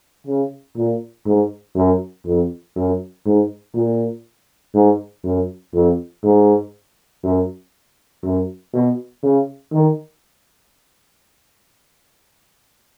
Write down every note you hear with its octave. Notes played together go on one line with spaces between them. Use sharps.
C#3
A#2
G#2
F#2
F2
F#2
G#2
A#2
G#2
F#2
F2
G#2
F#2
F#2
B2
C#3
D#3